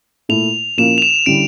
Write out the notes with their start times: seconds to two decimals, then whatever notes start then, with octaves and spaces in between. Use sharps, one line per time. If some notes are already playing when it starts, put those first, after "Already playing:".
0.29 A#2 A3 E4 F7
0.77 A#2 F3 A#3 C#4 E4 E7
0.98 F7
1.02 E7
1.26 D3 G3 C#4 E4 D7